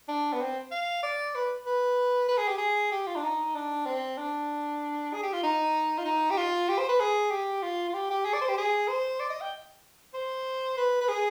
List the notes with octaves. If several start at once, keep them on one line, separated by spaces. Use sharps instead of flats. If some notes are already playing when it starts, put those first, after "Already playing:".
D4
B3
C4
F5
D5
B4
B4
B4
G#4
G4
G#4
G4
F4
D4
D#4
D4
C4
D4
G#4
G4
F4
D#4
F4
D#4
G4
F4
G4
C5
B4
G#4
G4
F4
F4
G4
G4
G#4
D5
C5
G4
G#4
C5
D5
D#5
G5
C5
B4
B4
G#4